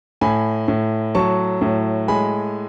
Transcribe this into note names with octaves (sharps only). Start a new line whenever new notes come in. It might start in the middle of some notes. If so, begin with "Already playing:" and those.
A2 G#5 B5
A2
F#3 A5 C#6
A2
G#3 G#5 B5